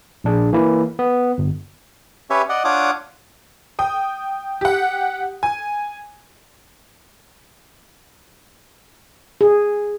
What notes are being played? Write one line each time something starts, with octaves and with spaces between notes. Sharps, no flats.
A#1 D4 G#4
E3 A#3 E4
B3
G1
C#4 G4 B4 C#5 E5
D5 D#5 F#5
D4 F4 C#5 F#5 D6 D#6
G5 D#6
G4 F#5
G#5
G#4